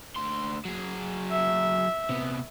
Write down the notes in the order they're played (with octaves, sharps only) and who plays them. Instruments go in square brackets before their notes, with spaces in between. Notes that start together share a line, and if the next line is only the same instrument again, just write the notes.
[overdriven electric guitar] D2 C6
F#3 G#4
[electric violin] E5
[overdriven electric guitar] C3 B3